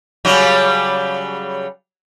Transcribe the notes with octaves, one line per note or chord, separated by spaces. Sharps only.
C#3 F#3 G3